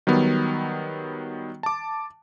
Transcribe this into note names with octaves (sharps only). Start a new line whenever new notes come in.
D#3 F#3 G3 B3
A5 D6